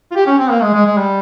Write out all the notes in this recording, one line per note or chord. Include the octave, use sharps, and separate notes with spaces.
F4
G4
C#4
C4
A#3
G#3
G#3
G#3
G3